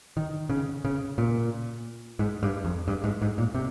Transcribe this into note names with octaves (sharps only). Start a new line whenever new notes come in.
D#3
C#3
C#3
A#2
G#2
G2
F2
G2
G#2
G#2
A#2
C3